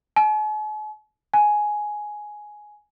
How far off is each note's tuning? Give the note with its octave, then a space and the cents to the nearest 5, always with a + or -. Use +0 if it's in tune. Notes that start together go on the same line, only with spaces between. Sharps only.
G#5 +45
G#5 +10